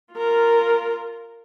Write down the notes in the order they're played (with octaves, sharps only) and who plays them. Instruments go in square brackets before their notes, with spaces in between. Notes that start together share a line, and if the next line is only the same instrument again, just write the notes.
[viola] F4 A#4